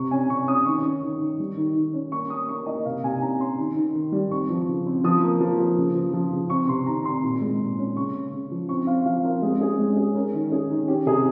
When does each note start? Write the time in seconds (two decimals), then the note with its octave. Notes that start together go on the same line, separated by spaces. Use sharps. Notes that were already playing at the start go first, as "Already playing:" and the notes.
Already playing: C3 C#6
0.11 C#4 G#5
0.30 C3 C#6
0.48 C#4 D#6
0.66 D#3 C#6
0.85 C#4
1.03 D#3
1.21 D#3
1.40 G3
1.57 D#3
1.75 D#3
1.93 C#4
2.12 A#3 C#6
2.30 C#4 D#6
2.49 A#3 C#6
2.66 A#3 D#5
2.85 C3 F5
3.04 C3 G#5
3.21 C#4 A#5
3.40 C#4 C6
3.59 D#3
3.76 D#3
3.95 D#3
4.12 G3
4.31 C4 C#6
4.50 F3
4.68 C#3
4.87 C4
5.04 F3 D#6
5.23 A#3
5.41 F3
5.60 F3
5.78 C#3
5.95 F3
6.13 F3
6.32 C#3
6.50 C4 C#6
6.69 C3 C6
6.86 D#3 A#5
7.05 C4 C6
7.24 A#2
7.41 G#3
7.60 A#2
7.78 C#4
7.96 C#3 C#6
8.14 C#3
8.33 C#3
8.52 F3
8.69 C4 C#6
8.87 C4 F5
9.05 F3 F5
9.24 C4 A#4
9.42 G#3 G#4
9.60 C#4 G#4
9.79 G#3
9.96 C#4 G#4
10.15 C#4 A#4
10.34 D#3
10.51 C#4 G#4
10.70 D#3
10.88 C#4 G4
11.06 C3 G#4